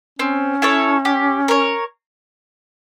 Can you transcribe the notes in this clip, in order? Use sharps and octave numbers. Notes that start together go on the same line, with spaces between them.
C4 C#4
E4 A4 C#5
G4
A#4 C#5